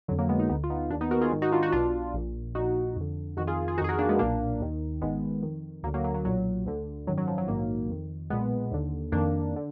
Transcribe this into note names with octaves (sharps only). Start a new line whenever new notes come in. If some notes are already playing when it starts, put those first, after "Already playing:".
F2 D3 F#3
F#3 A#3
G#3 B3
B3 D#4
D2 D3 B3 D#4
F4
B3 D#4
D#2 D#3 A#3 D4
B3 D#4
F#4 A#4
F4 G#4
G#1 G#2 D#3
D#4 F#4
D4 F4
D#4 F#4
B1 B2 D4 F4
A#1 A#2
A#1 A#2 D#4 F#4
F2 D3
F2 D#3 D#4 F#4
F4 G#4
F4 G#4
F2 D#3 D#4 F#4 G#4
F#4 A#4
A#3 D4
G#3 B3
B1 A#2 A#3 D4
D#2 D#3
G#1 G#2 D#3 G#3 B3
F2 D#3
D2 D3 F#3 A#3
F#3 A#3
F#3 A#3
F#3
B1 A#2 F#3
D2 D3
G#1 F#2 D#3 F#3
F#3
F3
F#3
A#1 G#2 D#3 F#3 A#3
F2 D#3
B1 A#2 G#3 B3
D#2 D3
F2 D#3 A#3 D4
D3